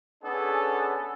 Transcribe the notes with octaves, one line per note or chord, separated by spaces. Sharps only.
B3 C#4 D4 G#4 A4